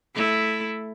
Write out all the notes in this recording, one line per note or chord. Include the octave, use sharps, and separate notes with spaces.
A3 E4